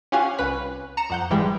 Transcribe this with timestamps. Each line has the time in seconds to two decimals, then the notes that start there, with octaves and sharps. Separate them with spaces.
0.12 C#4 F4 G4 F5 F#5 G#5
0.38 C2 C#4 B4 F#6 B6
0.97 A#5 C#7 E7
1.10 F2 F#5 G6
1.30 G#1 E3 G3 G#3 G5